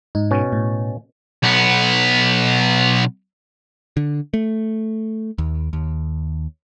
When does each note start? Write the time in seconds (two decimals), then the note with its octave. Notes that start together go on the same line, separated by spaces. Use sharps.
0.15 G#2 D#4
0.31 B2 C#4
0.53 A2
1.43 B1 B3
3.97 D3
4.34 A3
5.38 D#2
5.73 D#2